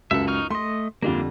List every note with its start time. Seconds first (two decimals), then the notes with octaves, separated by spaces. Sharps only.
0.11 C#2 F#2 A4 E5
0.28 D#4 C#6 F6
0.51 A3 D#5 C6
1.02 F2 D3 G3 A#3 D4 F4